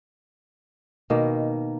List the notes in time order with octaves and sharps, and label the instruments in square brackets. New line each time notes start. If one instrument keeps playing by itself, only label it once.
[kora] B2 D#3 A#3